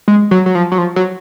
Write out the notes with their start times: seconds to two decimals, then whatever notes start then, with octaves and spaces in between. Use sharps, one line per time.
0.08 G#3
0.31 F#3
0.46 F#3
0.55 F3
0.72 F#3
0.78 F3
0.96 F#3